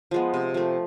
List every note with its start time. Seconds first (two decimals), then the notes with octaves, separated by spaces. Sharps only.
0.11 F3 G#3 B3
0.34 C3
0.54 F3 A3